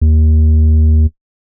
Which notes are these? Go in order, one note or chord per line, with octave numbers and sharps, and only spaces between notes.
D#2